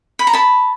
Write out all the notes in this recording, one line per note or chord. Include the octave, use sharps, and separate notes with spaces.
B5
A#5
A5 B5